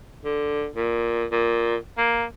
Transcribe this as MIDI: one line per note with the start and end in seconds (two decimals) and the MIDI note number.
0.25 0.68 50
0.76 1.25 46
1.32 1.76 46
1.98 2.25 58